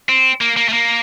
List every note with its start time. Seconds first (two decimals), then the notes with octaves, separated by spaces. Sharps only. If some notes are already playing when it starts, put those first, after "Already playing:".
0.09 C4
0.41 A#3
0.57 A#3
0.69 A3
0.73 A#3